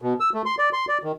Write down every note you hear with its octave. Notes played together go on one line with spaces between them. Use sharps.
B2
E6
A3
C6
D5
C6
D5
D#3